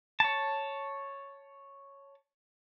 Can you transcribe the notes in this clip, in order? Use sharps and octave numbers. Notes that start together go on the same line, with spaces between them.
C#5 A5